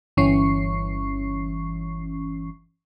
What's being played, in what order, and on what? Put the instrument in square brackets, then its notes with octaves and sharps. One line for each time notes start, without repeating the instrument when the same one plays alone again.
[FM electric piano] G1 E3 C#4 C#6 C7